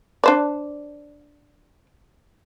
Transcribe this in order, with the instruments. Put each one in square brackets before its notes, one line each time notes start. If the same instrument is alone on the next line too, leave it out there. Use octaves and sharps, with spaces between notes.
[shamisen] D4 C5 D5